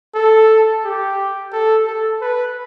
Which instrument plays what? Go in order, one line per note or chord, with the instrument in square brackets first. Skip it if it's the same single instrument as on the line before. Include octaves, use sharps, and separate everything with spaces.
[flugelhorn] A4
G4
A4
A4
B4